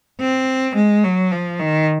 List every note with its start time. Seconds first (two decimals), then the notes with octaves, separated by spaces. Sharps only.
0.20 C4
0.75 G#3
1.04 F#3
1.32 F3
1.60 D#3